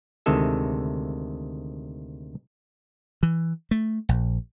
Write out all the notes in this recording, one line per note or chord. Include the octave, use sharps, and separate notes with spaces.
D2 C3 D#3 G#3 A4 E5
E3
A3
A#1